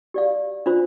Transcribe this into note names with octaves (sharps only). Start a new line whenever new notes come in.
G4 D5 F5
D4 F4 C5